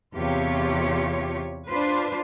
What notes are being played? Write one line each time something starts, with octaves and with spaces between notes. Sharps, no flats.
E2 C3 F4 G4 C#5
D4 F4 B4 C5